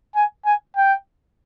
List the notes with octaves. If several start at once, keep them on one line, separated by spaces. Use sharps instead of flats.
G#5
G#5
G5